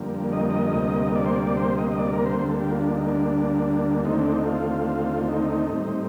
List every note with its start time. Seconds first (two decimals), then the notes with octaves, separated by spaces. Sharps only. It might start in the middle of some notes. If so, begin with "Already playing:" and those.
Already playing: F2 D3 G3 A#3
0.33 D#5
0.50 D#5
0.74 D2 C3 G3 A#3
1.15 D5
1.26 C5
1.36 D5
1.47 D5
1.57 C5
1.78 D#5
1.92 D#5
1.98 D5
2.12 A#4
2.26 C5
2.39 D2 D3 G3 A#3 C5
2.50 A4
2.61 G4
2.70 F4
2.81 D4
2.95 D#4
3.08 D4
4.05 D#2 D3 A3 C4 D#4
4.19 D4
4.32 D#4
4.46 F4
5.28 D#4
5.70 A2 G3 C4